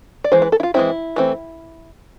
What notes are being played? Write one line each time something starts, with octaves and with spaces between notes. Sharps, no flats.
D5
E3 G#3 C5
B4
A4
E4
F4
E3 G#3 C4 E4
E3 A3 C4